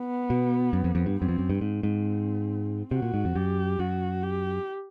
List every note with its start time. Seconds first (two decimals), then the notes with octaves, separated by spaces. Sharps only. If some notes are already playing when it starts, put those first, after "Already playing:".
Already playing: B3
0.30 B2
0.73 F#2
0.84 F2
0.95 F2
1.06 G2
1.17 F#2 C4
1.29 F2
1.38 F#2
1.50 G2
1.61 G#2 C4
1.83 G#2
2.91 C3 F#4
3.02 A#2
3.14 G#2
3.25 F2
3.35 F#2 G4
3.79 F#2 F#4
4.23 G4